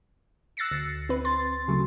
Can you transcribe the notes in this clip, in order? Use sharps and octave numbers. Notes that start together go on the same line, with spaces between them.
E6 F#6 A6 A#6 C7 C#7
D2
C4 B4
C6 A6
C#3 F#3 A3